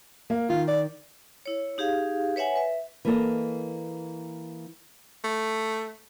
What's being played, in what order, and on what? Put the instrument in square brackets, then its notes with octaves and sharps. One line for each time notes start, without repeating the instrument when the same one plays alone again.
[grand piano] A#3
[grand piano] D#3 [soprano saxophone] F4
[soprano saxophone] D5
[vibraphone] E4 C#5
D#4 G4 G#4 F5
B4 C#5 E5 F#5 G#5
B4 E5
[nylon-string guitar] E3 A#3 A4 D#5
[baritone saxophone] A3